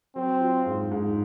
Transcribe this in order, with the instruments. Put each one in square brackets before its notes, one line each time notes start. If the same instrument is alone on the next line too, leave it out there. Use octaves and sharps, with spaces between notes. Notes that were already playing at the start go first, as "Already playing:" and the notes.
[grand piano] F#3 [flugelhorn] C4
[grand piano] F4
G#2
G#2